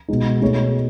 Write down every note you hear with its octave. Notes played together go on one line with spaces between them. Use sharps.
B2 G#3 D#4
B2 A3 D#4 G#4 C#5